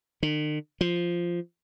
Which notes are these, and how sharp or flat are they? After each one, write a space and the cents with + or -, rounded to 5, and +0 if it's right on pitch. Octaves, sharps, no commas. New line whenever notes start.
D#3 -45
F3 -5